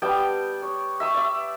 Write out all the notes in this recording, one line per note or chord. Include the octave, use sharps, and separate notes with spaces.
G3 B3 G5 A5
C#5
E5 C#6 D#6
D5 E5